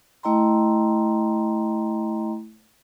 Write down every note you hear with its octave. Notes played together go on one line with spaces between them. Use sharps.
A3 E4 D#5 G5 A#5 C6